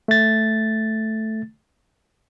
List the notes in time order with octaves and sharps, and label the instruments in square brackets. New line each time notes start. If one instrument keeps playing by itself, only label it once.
[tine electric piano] A3 A6